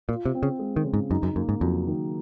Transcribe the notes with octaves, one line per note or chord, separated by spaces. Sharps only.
A#2 F4
C3
C4
C#3
G#3
D#3
C#3
G#2
F#2 D#4
F#2
F#2 A#3
G#2
F2 F#3
D#3